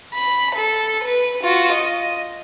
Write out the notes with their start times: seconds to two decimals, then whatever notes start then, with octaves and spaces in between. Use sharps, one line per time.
0.15 B5
0.55 A4
1.04 B4
1.43 F4 F#4
1.73 D#5